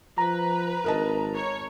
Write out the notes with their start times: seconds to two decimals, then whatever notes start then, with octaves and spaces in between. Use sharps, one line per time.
0.18 F3 B4 A#5
0.84 G#1 A#4 D#5 A5
1.35 C#5